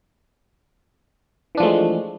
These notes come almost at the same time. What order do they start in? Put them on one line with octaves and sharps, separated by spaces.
E3 D4 F3 A3 G#3